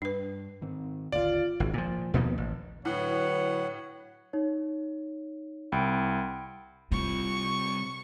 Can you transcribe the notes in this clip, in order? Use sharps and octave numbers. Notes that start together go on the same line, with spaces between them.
G2 D4 B4
G#2 D#3 C4
G#1 D#2 D3 F4 D5 F5
G#1
A#2 F3
D#2 B2 F3 A#3
A1
A2 D3 F#3 B4 C#5 F#5
D#4 C#5
C2 G5 B5 D7
C3 G3 F4 C#6